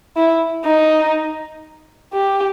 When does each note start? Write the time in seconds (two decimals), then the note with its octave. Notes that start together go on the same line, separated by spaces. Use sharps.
0.16 E4
0.65 D#4
2.14 G4